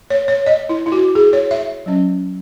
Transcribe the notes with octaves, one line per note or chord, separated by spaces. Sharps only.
C#5
C#5
D#5
E4
E4
F#4
G#4
C#5
E5
F#3 C#4